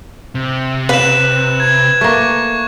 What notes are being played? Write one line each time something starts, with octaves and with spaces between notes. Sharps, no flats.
C3
B4 F#6 E7
G#6
A3 A#3 C#6